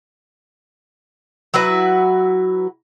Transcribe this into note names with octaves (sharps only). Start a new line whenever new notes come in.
F#3 E4 F#4 B4